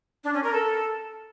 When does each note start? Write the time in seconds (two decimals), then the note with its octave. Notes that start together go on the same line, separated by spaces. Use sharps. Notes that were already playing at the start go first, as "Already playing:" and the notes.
0.24 D4
0.34 C#4
0.43 A#4
0.53 A4